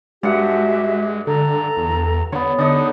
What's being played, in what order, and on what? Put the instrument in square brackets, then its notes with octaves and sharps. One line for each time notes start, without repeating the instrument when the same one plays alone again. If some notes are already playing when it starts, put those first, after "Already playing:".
[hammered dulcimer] G2 F#5 [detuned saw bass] G#3 [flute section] F#4 G4 E5
[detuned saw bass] D3 [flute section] A4 A#5
[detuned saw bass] E2
[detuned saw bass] D3 [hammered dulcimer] B3 C#5
[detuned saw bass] D3 [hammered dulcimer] D4 D#4 [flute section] D#6